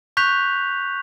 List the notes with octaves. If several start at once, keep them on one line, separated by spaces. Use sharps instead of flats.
C#6 F#6 G6 B6 F7